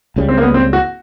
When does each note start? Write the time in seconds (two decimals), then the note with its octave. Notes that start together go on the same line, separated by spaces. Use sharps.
0.16 C#2 C#3 E3 G3
0.29 C4
0.37 A#3
0.42 B3
0.54 C4
0.73 F#4